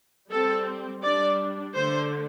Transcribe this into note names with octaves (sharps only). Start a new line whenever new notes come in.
G3 C4 A4
G3 D4 D5
D3 A3 D4 C5